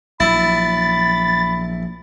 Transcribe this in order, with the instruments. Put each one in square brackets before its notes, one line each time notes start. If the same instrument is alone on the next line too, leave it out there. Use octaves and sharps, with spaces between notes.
[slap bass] A#1 F#3 [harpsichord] E4 [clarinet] B5 [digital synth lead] A6